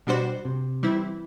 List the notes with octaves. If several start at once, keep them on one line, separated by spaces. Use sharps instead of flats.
B2 G3 D4 F#4 C5
C3
E3 G3 C4 E4